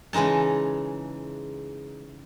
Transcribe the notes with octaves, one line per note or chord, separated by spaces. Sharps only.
C#3 E3 G#3 D#4 A5